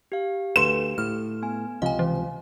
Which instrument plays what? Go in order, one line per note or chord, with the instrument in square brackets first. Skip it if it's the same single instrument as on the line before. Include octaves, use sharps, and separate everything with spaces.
[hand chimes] G4 F5
[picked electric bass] D2 [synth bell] A4 B4 C6 [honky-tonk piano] E7
[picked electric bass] A2 [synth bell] F6
[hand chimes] B3 G#5
[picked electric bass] C#2 C3 F3 [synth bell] D#5 G#5 [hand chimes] F5
[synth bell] E3